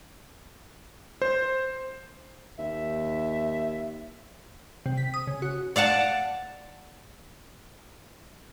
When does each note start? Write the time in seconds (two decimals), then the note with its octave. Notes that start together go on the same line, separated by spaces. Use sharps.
1.22 C5
2.59 D#2 E5
4.86 C3
4.97 B6
5.14 D#6
5.27 C#3
5.42 F#4
5.76 D5 F5 F#5 A5